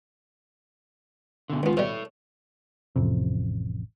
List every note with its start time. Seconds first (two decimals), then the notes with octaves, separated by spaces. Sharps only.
1.50 B2 D3
1.63 C#2 D#3 B3 F4
1.77 B2 G3 A4 C#5
2.96 A1 F2 C3